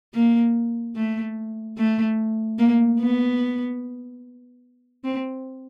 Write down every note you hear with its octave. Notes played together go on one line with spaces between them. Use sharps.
A#3
A3
A3
A#3
B3
C4